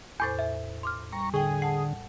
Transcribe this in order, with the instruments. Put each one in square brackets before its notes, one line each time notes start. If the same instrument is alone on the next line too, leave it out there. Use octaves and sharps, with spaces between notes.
[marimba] E2 A2 C5 [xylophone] G#5 D6 A6
[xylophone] E5
C6 D6 F6
[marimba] G3 [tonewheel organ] A#5 C#6
[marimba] A2 G5 [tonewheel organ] D3 [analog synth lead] G#4
[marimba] F#5 A5 [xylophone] C7